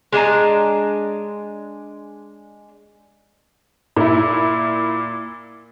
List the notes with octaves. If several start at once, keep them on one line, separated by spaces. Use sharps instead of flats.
G#3 D4 D#5 A#5
A#2 E4